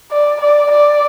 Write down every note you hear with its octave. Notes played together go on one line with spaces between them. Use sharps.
D5
D5
D5